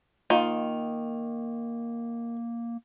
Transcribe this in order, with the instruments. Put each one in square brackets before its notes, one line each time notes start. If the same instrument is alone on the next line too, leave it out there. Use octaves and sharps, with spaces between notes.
[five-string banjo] D#3 [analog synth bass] A#3 [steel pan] F4